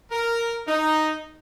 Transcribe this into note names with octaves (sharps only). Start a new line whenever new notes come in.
A#4
D#4